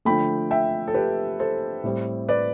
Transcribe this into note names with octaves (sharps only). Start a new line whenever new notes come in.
D3 F3 A3 G5 B5
E5 G5
A4
G4 B4
A4 C5
A2 G3 C4
B4 D5